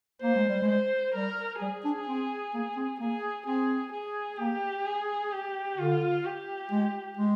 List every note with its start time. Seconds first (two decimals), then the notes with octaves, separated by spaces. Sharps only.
0.22 A#3 C5
0.36 G#3
0.49 G3
0.62 G#3
0.68 C5
1.15 G3 A#4
1.61 G3 G#4
1.85 D4
2.07 C4
2.54 A#3
2.77 C4
3.00 A#3 G#4
3.47 C4 G#4
3.93 G#4
4.39 A#3 G4
4.86 G#4
5.32 G4
5.78 D3 F4
6.25 G4
6.71 G#3
7.17 G#3